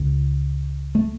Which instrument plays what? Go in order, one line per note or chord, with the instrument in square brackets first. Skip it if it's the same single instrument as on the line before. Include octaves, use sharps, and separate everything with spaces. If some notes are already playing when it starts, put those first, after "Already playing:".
Already playing: [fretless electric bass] C#2 C#3
A3